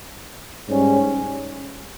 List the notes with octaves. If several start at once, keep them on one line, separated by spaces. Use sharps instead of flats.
G#2 G3 C#4